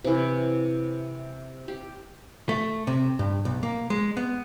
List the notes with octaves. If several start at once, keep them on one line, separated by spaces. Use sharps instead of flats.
C3 E3
G4
A3
C3
G2
B1
A#3
G#3
B3